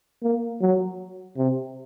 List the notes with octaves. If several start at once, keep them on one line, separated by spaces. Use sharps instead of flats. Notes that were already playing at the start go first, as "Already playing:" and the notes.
A#3
F#3
C3